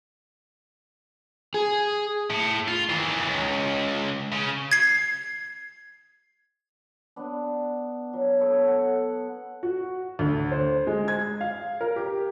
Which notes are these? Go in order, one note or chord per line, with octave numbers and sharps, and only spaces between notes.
G#4
A2
F4
D#3 E3
C#2
C#3
G#6 C7
B3 D4
F#3
B3 A4 C#5
F#5
F#4
D2
C5
G#3
G#6
F5
A#4
G4